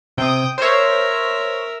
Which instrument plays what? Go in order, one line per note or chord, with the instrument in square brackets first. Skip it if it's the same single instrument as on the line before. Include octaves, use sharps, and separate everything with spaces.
[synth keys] C3 [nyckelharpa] G5 D#6
[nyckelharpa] A#4 E5 [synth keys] C5 C#5